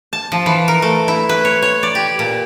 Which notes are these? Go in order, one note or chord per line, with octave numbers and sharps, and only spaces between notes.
A5
F3
E3
A#4
A3
E4
B4
C#5
C#5
D5
G4
A#2